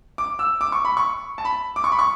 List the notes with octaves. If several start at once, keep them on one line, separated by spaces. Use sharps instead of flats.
D6
E6
D6
C#6
B5
C#6
A5
B5
D6
C#6
B5
C#6